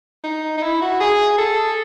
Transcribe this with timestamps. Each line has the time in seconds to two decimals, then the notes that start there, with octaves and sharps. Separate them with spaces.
0.24 D#4
0.57 D#4
0.63 E4
0.82 F#4
1.00 G#4
1.38 A4